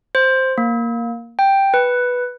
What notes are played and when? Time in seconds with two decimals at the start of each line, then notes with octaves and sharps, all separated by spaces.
0.15 C5
0.58 A#3
1.39 G5
1.74 B4